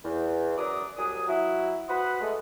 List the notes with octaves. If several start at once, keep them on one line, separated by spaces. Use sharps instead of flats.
E2
F#2 F#3 A#4 D5 A#5 D#6
C2 F#3 G#4 D#6
F#3 E4 F#4
F#4 B4 C5 F#5 B5 D#6
G#3 A3